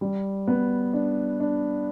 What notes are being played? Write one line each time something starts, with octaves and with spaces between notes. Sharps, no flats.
G3
B3
D4
D4